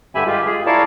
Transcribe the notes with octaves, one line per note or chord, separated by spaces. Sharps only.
G2 D3 G4 E5 G#5 B5
G#3 F4 G4
G#4
E4 A#4 C#5 D5 F5 A5